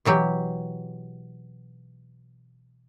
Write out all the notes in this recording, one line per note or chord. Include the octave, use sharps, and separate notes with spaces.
B2 E3 F#3 G4